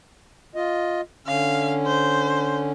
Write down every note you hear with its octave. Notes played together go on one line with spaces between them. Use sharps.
F4 D#5
D3 C#4 F5
C5